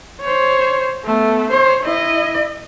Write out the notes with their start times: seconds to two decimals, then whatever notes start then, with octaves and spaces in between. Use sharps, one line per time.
0.21 C5 C#5
1.04 A3 B3
1.50 C5 C#5
1.83 E4 D#5